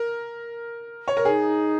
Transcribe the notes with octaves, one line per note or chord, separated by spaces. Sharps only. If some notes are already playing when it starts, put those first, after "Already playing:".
Already playing: A#4
C#5
A#4
D#4 G#4